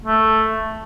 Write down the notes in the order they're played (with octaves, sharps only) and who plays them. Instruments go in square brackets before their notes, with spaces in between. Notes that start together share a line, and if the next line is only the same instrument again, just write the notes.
[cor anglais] A3